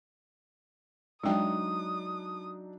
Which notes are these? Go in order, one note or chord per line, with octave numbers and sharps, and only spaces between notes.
F#3 G#3 D4 D#4 G5 D#6